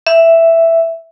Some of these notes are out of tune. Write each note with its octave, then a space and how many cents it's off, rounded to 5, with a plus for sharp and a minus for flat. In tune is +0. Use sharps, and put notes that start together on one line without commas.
E5 +5